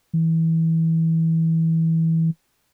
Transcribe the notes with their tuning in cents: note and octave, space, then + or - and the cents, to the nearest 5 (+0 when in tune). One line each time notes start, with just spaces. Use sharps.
E3 -20